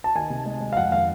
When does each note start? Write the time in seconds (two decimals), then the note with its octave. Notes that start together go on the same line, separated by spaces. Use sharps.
0.04 A5
0.15 D#3 G#5
0.30 C3
0.46 G#3
0.61 G#3
0.73 F5
0.77 F2 F#5
0.91 D#3 F5